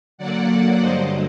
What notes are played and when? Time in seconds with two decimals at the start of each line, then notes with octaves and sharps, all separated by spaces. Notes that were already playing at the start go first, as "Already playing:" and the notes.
0.18 D3 F#3 A#3 D5 F#5
0.80 G2 D3 F#3 C5 D#5